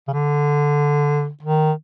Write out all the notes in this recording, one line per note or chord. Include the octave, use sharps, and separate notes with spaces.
C#3
D3
D#3